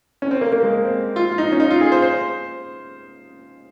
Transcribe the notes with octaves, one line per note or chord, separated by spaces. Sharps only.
C#4
C4
A#3
A#3
G#3
C4
F4
F4
D#4
C#4
D#4
F4
G#4
C5
C5